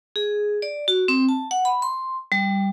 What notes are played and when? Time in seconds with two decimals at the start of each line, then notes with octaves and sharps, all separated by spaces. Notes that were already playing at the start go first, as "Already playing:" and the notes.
0.16 G#4
0.62 D5
0.88 F#4
1.08 C4
1.29 A5
1.51 F#5
1.65 B5
1.82 C6
2.32 G3